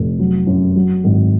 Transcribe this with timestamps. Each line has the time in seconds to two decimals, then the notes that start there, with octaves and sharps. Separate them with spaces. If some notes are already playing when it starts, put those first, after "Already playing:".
Already playing: F1
0.19 F#3
0.47 F#2
0.76 F#3
1.04 G#1